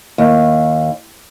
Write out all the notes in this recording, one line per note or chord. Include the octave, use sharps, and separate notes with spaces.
D#2